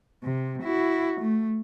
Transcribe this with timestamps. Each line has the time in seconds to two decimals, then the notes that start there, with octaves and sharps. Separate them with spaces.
0.24 C3
0.62 E4 F#4
1.20 A3